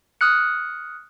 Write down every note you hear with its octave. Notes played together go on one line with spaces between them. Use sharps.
D#6 F6 F#6 C#7